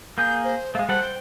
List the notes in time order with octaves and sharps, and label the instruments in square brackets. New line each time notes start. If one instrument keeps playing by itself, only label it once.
[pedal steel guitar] A#3 G#4 [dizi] G6
[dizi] C5
[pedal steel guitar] G#3 A3 [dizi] F5
[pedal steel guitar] G3 A4 F#5 [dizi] C5
[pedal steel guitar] G5